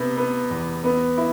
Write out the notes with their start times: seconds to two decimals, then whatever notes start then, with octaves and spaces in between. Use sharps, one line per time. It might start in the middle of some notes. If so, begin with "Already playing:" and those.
Already playing: C3 B3
0.17 B3
0.50 E2
0.84 B3
1.17 E4